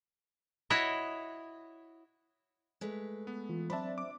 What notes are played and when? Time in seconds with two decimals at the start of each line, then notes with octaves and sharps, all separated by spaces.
0.70 E4 F#4 C#5 D#5
2.81 G#3 A3 B4
3.27 B3
3.49 E3 F4
3.70 F#3 C4 D4 C5 D5 E5 A5 B5
3.98 D6